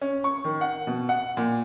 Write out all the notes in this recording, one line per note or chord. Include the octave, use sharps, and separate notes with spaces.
C#4
C#6
D#3
F#5
B2
F#5
A#2